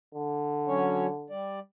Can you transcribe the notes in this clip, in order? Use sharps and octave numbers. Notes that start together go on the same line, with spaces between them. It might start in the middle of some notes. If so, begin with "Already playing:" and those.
D3
F#3 C#4 C#5
G3 D5